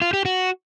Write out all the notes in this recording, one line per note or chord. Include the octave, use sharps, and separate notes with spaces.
F4
G4
F#4